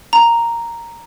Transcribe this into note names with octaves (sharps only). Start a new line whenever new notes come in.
A#5